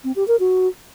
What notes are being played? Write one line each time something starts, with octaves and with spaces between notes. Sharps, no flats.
C4
G4
A#4
F#4